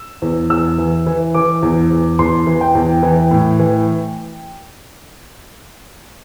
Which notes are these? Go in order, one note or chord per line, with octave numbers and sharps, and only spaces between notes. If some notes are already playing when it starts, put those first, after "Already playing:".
Already playing: E6
E2
E2 E6
E3
E3
E3 D6
E2
E2
E2 C6
E3
G5
E2
E3
A2
E3